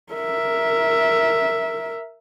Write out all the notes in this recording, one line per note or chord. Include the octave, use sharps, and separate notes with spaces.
A#4 E5